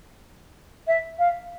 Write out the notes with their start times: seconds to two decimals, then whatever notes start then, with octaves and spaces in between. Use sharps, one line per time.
0.87 E5
1.18 F5